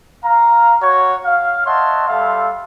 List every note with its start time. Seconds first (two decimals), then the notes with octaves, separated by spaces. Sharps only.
0.24 F5 A#5
0.82 F#4 C#5
1.26 F5
1.66 C#5 D#5 E5 F#5 A5 C6
2.08 G3 A4 E5 F5 C6